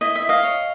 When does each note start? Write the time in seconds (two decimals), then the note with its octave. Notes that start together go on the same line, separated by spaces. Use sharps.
0.01 E4 D#5
0.15 E5
0.22 E4
0.29 D#5 F5
0.43 C#5